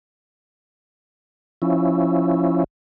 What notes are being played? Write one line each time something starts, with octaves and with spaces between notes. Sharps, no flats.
F3 C#4 E4